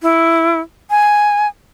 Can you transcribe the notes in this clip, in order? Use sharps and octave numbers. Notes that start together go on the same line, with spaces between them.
E4
G#5